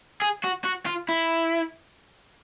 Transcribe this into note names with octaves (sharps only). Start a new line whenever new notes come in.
G#4
F#4
F#4
F4
E4